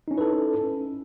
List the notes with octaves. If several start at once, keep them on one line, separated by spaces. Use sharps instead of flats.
C#4 D#4 E4 A4 B4